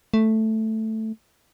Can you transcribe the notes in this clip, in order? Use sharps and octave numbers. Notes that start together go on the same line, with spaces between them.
A3